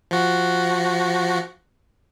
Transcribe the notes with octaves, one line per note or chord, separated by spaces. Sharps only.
F3 F#4